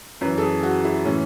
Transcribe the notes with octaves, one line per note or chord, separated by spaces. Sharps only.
F#2 E3 B4
A4
G#4
F#4
E4
A2 E3 C#4